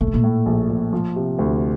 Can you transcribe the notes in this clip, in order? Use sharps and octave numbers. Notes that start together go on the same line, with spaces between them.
A#2 A3
C3
A#2
A2
A#1
A#1
F3
C3
D2